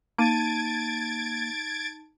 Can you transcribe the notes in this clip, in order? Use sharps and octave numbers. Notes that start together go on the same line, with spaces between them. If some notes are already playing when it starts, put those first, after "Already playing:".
A#3 D#4 A5 G#6 A6 D7 D#7